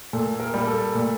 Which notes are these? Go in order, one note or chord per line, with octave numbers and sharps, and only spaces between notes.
A#2 A4
A#4
G3 A#3
A4
A#2